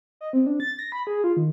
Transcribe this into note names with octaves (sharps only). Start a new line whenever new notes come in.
D#5
C4
D4
A6
A#6
B5
G#4
F4
D#3